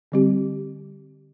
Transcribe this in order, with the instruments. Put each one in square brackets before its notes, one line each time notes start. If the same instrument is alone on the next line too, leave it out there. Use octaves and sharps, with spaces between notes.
[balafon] D3 G3 C4 G4